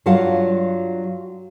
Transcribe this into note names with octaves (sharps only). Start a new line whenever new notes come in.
G2 F#3 F4 F5 F#5 A5